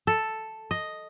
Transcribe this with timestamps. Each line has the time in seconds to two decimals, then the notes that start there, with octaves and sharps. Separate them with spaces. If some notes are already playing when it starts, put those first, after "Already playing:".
0.07 A4
0.71 D#5